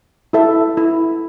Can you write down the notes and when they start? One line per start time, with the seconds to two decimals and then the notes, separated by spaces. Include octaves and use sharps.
0.33 E4 A4 E5
0.77 E4